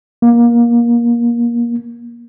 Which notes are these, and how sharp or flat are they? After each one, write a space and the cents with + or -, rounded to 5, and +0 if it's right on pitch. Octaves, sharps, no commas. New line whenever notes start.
A#3 +25